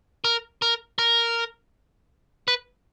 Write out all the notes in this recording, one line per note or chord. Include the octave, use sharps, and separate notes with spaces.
A#4
A#4
A#4
B4